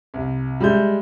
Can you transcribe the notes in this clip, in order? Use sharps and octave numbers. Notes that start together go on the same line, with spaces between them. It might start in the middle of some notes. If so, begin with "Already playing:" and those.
C2
G3 G#3 E5 G6